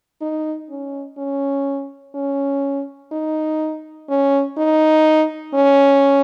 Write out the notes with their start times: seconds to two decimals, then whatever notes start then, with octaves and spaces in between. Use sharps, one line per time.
0.21 D#4
0.70 C#4
1.18 C#4
2.15 C#4
3.12 D#4
4.09 C#4
4.57 D#4
5.54 C#4